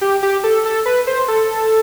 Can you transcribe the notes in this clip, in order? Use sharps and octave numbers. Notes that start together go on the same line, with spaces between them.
G4
G4
A4
A4
B4
C5
A4